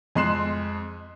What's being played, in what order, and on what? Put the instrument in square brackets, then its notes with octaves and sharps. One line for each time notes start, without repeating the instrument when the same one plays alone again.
[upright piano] F2 G#3 C6 F#6 C7 E7